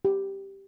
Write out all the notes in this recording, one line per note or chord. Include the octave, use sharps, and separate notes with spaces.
G4